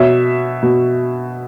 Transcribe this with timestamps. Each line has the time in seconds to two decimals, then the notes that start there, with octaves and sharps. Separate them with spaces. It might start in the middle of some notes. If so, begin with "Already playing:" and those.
Already playing: B2 C#5 E5
0.62 B2